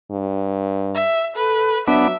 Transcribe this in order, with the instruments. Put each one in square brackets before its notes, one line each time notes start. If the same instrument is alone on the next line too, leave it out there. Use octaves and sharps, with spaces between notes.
[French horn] G2
[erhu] E5
[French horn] A4 [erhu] B4
[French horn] F#3 [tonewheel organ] B3 D4 [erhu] E5